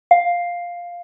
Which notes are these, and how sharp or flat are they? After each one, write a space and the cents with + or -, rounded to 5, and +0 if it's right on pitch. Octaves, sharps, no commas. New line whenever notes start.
F5 +5